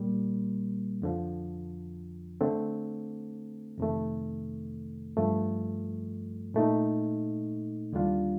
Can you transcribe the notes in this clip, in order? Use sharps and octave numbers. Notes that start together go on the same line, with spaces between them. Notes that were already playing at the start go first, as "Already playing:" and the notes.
Already playing: A#2 G3 A#3
F2 D3 F3
D3 A3 C4
F2 C3 D#3 A3
G2 F3 A3
A#2 A3 D#4
D#2 D3 G3 D4 F4